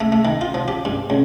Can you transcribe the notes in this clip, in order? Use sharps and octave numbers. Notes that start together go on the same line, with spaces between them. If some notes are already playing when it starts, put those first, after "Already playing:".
A3
A3
D#3
F4
F3
G4
G2
C#2